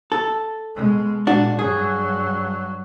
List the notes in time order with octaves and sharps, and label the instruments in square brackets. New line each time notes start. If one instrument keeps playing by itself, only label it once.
[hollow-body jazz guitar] A4
[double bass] B2 G#3
[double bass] A#2 G#3 [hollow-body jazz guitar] D4 F#4
[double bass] G2 F#3 [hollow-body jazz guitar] G#4